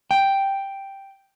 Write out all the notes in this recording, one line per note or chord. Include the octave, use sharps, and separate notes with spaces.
G5